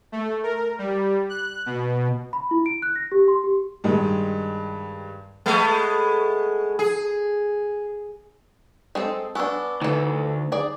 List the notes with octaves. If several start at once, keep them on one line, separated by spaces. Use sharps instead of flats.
A3
A#4
G3
F#6
B2
B5
E4
D7
F#6
A#6
G4
C6
G4
G2 D#3 G#3
G#3 A3 B3
G#4
G#3 C4 A4
B3 D4 G#5 C#6 E6
D2 E3 D#4 A4
G#4 D5